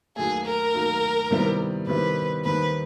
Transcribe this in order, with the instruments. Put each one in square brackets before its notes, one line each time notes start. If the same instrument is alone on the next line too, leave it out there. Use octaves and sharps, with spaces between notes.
[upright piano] D#2 D#3 F#3 A3 [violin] G#4
[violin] A#4
[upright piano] D#2 D#3 F#3 A3
C3 D#3 G3 B3 E4
[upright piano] C3 D#3 G3 B3 E4 [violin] B4
[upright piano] D#2 D#3 G3 C4 D#4 [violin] B4